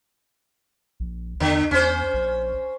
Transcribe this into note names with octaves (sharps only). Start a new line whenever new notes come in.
A#1
E2 D3
E2 C#4 C5
A#1